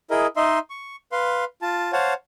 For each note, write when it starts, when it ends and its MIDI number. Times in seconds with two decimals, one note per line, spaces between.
0.10 0.27 64
0.10 0.27 68
0.10 0.27 70
0.10 0.27 75
0.37 0.59 63
0.37 0.59 75
0.37 0.59 76
0.37 0.59 84
0.70 0.96 85
1.12 1.44 71
1.12 1.44 77
1.12 1.44 84
1.62 1.92 65
1.62 1.92 81
1.93 2.14 72
1.93 2.14 73
1.93 2.14 77
1.93 2.14 78
1.93 2.14 81